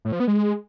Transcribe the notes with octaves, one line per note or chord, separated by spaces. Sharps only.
A2
F3
B3
G#3